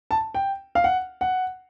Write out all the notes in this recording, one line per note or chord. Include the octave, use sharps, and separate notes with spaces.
A5
G5
F5
F#5
F#5